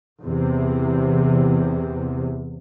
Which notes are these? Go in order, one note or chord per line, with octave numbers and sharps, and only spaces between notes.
E2 C3